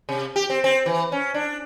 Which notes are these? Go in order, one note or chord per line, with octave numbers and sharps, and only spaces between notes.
C3
G4
C4
C4
E3
C#4
D4